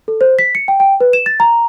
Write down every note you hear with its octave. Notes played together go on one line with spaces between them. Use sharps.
A4
C5
B6
C#7
G5
G5
B4
E7
A6
A#5